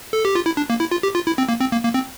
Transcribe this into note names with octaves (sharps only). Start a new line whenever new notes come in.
A4
G4
F4
E4
D4
A#3
E4
F4
G4
F4
E4
C4
A#3
C4
A#3
A#3
C4